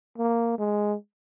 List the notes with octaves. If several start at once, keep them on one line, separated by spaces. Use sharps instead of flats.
A#3
G#3